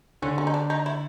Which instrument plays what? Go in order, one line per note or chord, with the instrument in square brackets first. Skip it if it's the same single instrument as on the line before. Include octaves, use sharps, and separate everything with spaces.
[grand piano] D3 [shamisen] C#4
[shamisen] C#4
D#4
D4
D#4
E4